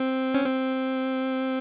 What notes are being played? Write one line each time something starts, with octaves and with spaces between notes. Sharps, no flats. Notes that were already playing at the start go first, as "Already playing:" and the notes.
Already playing: C4
C#4
C4